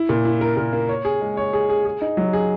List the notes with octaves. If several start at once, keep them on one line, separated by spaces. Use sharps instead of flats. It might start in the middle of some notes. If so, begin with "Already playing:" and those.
Already playing: E4
A#2
E4
A#4
A#2
A#3
C#5
G#4
G#3
C#5
G#4
G#4
G#4
D#4
F#3
G#4